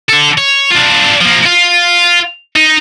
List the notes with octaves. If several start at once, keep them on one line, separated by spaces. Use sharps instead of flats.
D3 A4
C#5
D4 F4
F3 A#3
F4
D#4